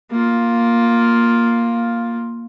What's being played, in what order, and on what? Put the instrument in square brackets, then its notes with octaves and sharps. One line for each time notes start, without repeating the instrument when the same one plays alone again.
[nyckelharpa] A#3 F4